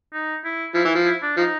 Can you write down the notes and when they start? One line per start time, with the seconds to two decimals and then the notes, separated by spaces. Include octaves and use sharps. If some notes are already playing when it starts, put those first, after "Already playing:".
0.13 D#4
0.45 E4
0.75 F3 E4
0.85 E3
0.95 F3
1.06 E4
1.22 D4
1.37 F3 D#4